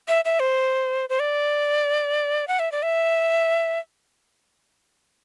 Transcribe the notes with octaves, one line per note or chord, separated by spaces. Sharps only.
E5
E5
C5
C5
D5
F#5
E5
D5
E5